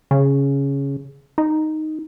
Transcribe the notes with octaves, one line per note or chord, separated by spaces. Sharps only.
C#3
D#4